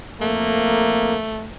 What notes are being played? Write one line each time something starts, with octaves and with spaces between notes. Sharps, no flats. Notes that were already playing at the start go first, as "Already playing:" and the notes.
F2 A3 A#3